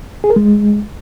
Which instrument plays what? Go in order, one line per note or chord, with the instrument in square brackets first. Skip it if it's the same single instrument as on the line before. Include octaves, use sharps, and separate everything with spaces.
[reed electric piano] G#4
A#4
G#3